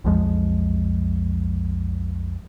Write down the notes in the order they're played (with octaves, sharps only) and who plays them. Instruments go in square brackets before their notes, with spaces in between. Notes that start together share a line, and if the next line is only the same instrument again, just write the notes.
[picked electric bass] B1 F2 F3 G#3